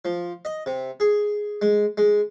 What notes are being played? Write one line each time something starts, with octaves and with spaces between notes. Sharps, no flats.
F3
D#5
C3
G#4
G#3
G#3